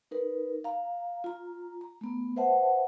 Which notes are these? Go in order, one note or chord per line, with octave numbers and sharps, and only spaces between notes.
D#4 A#4 B4
F5 A#5
F4 A#5
A#5
A3 B3
B4 C5 E5 F#5 A5